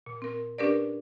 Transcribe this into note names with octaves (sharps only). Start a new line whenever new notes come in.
A#2
C4 A#4
C#4 D4 G4 A#4 B4 D5